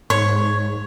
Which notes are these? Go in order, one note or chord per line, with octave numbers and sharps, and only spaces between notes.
G#2 C#5